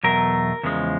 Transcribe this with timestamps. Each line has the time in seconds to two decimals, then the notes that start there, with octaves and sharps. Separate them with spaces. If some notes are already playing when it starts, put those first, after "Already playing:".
0.03 E2 B2 F#3 A3 A#4
0.63 E2 C#3 F3 G#3